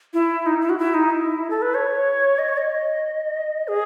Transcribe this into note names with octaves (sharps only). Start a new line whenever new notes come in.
E4
D#4
E4
F#4
E4
D#4
E4
A4
B4
C#5
D#5
C#5
D#5
G#4